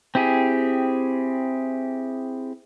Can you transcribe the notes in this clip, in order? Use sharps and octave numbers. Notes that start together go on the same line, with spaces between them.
C4 E4 G4 G#4